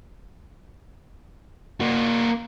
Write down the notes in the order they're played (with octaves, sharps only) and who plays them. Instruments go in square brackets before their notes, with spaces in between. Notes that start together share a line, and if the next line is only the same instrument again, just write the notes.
[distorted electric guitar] A#3 F#4